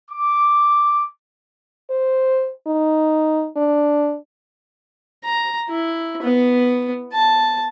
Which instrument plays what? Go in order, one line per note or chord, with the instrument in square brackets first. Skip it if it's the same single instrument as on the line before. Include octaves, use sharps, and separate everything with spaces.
[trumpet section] D6
[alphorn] C5
D#4
D4
[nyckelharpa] A#5
E4
B3
A5